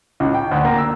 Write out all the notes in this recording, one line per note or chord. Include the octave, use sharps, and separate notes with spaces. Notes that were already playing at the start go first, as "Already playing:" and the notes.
C#2
G5
D2
A#3
E6